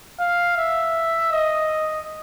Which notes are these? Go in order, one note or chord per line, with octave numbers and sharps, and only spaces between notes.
F5
E5
D#5